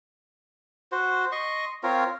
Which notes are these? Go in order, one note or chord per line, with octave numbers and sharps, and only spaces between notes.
F#4 C5
D#5 C6 C#6
C4 F4 A#4 C#5